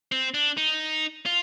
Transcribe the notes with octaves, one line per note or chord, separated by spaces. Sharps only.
C4
D4
D#4
F4